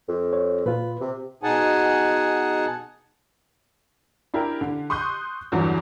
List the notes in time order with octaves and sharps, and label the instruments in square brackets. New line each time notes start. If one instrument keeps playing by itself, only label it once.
[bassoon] F2
[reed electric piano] C#5
[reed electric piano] A#2 F4 [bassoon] B4
[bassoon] C3
[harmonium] B2 D#4 G#4 F#5 G#5 A5
[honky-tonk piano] D4 E4 G4 A#4
D3
C6 C#6 D#6 F#6 G6
E2 G2 D3 E3 F#3